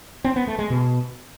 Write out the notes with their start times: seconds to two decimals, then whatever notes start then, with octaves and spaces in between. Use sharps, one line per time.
0.24 C4
0.36 B3
0.47 A3
0.59 G#3
0.70 B2